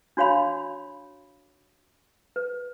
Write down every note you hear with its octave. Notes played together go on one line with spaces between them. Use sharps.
D4 F#4 C#5 F5 B5 C6
B4